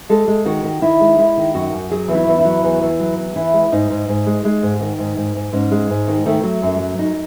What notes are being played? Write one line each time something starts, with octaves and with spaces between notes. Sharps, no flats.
G#3 A4
G#3
D#3 F#4
D#3
D#3 E4
G#3
G#3 E4
D#3
F#2 F#4
F#2
F#3 G#4
E2
E4
E2
E4
F#3
E2
E2
F#3
E2
E3 E4
G#3
G#2 D#4
G#2
G#2
G#3
G#3
G#2
D#3
G#2
G#2
G#2
G#2 C#4
G#3
G#2
D#3
D#3 A3
F#3
F#2
F#3
F#2 D#4